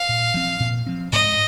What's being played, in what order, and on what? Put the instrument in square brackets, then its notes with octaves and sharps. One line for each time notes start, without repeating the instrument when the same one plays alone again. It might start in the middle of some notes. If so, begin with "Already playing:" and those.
Already playing: [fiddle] F5
[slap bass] A#2
F3 C4
A#2
F3 C4
[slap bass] G#2 [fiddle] D#5